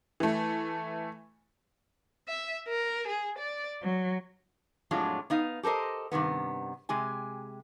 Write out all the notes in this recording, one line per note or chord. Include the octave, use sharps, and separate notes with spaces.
E3 A3
E5
A#4
G#4
D5
F#3
F2 A2 F#3 G#3 D4 F4
B3 D#4 F5
G4 A4 A#4 C5 D#5
G2 C3 D#3 B3
C3 G#3 G4 G#5